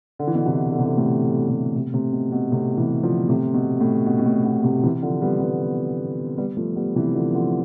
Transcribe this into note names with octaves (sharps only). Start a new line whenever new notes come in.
D3
E3
B2 D3
C3 E3
D3
C3
B2 D3
A2 C3
A2 C3
A2 C3
A2 C3
B2
B2
A2 C3
C3 E3
D3 F3
A2 C3
B2
A2
B2
B2
A2
B2
A2 C3
C3 E3
D3 F3
G3 B3
G3 B3
G3 B3
F3 A3
G3 B3
C3 E3
D3 F3
D3 F3